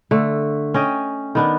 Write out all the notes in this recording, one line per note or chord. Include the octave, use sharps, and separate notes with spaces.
D3 A3
C#4 D#5 G5
D#3 B3 D4